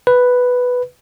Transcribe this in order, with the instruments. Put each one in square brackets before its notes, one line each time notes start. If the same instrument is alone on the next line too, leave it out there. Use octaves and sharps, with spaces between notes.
[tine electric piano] B4